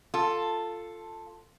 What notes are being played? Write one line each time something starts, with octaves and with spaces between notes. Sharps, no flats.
F4 A4